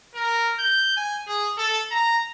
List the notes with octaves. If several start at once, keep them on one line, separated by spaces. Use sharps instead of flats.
A#4
G6
G#5
G#4
A4
A#5